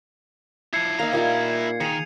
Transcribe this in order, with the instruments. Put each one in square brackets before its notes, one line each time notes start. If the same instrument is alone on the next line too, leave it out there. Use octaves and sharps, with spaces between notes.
[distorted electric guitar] F3 E4 [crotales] G#6 C7 C#7
[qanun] A#3 D#4 [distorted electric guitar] E4 A#5
[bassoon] A#2 [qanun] G3 A#3 F4
[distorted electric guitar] D#3 [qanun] G#4 [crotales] C#7 D#7 F7